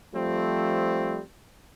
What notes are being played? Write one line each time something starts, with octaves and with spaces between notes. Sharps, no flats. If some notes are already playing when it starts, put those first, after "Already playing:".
F3 G3 A3 C4